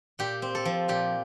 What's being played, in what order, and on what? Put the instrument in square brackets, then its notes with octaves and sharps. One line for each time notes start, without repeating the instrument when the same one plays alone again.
[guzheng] A#2 G4
C4
A4
F3
A#2 G4